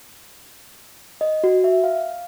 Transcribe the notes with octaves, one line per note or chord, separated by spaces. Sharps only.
D#5
F#4
E5
F5